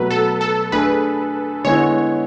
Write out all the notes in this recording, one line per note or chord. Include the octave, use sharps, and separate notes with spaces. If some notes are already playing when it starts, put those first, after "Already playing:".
Already playing: B2 F#3 A3 B4
A4
A4
A3 D4 G#4 B4
D3 G#3 B3 E4 C#5